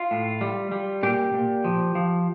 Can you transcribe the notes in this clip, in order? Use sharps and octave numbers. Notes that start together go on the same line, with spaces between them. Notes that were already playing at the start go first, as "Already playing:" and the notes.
Already playing: F4
A2
G3
G3
A#2 G4
A#2
F3
F3